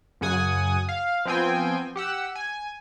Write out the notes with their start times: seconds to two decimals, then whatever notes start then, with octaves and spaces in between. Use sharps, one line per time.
0.21 F#2 C#3 F#5 G#5 D#6
0.89 F5
1.25 F3 B3 C4 G5 G#5
1.96 G4 F#5 E6
2.35 G#5